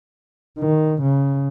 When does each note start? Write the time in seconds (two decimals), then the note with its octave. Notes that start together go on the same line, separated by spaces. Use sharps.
0.59 D#3
1.02 C#3